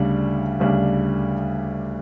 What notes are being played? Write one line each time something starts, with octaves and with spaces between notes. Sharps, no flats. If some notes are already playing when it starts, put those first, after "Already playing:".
Already playing: D2 C#3 G3 D4
D2 C#3 G3 D4